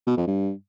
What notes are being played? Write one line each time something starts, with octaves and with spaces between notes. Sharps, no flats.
B2
F2
G2